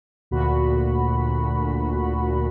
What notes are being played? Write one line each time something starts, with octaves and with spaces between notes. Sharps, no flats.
D2 A#2 F#4 B5